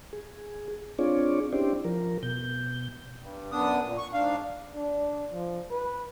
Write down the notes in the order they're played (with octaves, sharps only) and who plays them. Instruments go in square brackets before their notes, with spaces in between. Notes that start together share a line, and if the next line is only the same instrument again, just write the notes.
[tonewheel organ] G#4
C4 D4 F4 G#4 C#5 D5
C#4 D4 E4 G4 C5 D5
F3 A#4
B2 G6
[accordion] G2
F#2 B3 D4 D#6
A#2
C#6
G#2 D4 F5
[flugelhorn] D4
F3
B4